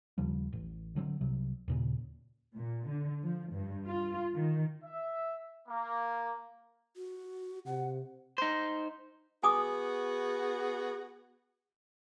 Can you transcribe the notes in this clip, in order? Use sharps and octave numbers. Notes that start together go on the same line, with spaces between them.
D#2 C#3 F3 G3
A1
D3 F#3 G#3 C4
C2 C3 F#3
D#2 A#2 C#3
A#2
D3
F3
G2
F4
D#3
E5
A#3
F#4
C3 F#5
D#4 C5
B3 F#4 G#4 G#5 D6 D#6